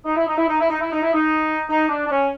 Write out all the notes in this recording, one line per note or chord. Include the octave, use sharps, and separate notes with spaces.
D#4
E4
D#4
E4
D#4
E4
D#4
E4
D#4
E4
D#4
D#4
D4
D4
C#4